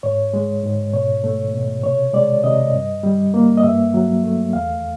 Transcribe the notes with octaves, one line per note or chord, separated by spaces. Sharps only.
G#2 C#5
G#3
G#2
B2 C#5
A3
B2
C3 C#5
G#3 D5
C3 D#5
G2
G3
A#3
D#5
G2 E5
F#3
A3
E2 F5